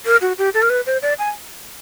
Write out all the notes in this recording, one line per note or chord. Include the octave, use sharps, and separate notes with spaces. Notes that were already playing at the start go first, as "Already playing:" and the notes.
A#4
F#4
G4
A4
A#4
B4
C5
D5
G#5